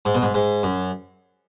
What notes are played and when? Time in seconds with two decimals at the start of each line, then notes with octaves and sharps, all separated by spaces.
0.05 G#2
0.15 B2
0.22 G#2
0.34 G#2
0.63 F#2